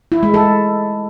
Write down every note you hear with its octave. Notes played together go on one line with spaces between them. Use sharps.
E4
G#3
A4